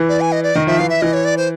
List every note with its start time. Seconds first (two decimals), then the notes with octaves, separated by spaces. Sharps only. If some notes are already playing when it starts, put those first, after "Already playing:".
Already playing: E3
0.09 D5
0.21 G#5
0.32 D#5
0.43 D5
0.55 D#3 D#5
0.67 F3 E5
0.78 E3 F5
0.90 E5
1.01 E3 D#5
1.13 C#5
1.25 D5
1.37 C5